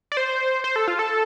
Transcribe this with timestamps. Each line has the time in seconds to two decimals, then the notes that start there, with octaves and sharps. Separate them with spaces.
0.12 D5
0.17 C5
0.64 C5
0.76 A4
0.88 F4
0.99 A4